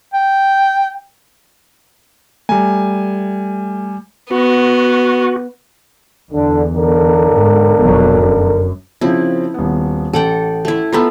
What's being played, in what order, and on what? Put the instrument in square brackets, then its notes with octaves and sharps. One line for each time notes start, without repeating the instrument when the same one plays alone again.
[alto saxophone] G5
[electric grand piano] G3 G#5 [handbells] A3
[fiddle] B3 [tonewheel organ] F#4
[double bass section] E2 [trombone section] D3
[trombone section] B1 D3 A#4
[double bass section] G#2
F1 B2 F#3
F#2
[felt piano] C#3 F3 C4 [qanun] E4
[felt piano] D#1 B3
[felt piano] A1 [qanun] A4 F#5 G5
[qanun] A3 E4
[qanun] A3 B3 F4 [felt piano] A#5 B5 E6